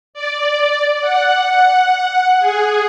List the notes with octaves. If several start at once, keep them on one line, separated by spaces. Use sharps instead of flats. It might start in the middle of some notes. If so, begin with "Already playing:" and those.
D5
F#5
G#4